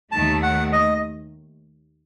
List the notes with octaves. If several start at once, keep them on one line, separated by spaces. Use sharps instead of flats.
D#2 D#3 A3 A5
F#5
D#5